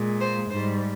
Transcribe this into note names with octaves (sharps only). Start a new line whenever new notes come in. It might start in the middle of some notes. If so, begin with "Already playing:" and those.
Already playing: A#2 G#3
C5
G#2 G3 C5